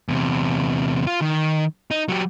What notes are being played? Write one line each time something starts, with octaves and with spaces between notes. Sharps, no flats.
E2 C3
F4
D#3
D#4
F#3 G4